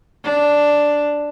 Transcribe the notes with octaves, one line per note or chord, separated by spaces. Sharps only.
D4